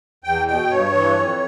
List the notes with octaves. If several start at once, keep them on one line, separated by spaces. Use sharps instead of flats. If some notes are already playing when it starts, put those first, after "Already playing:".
E2 G5
B2 G5
G2 C#5
E3
F2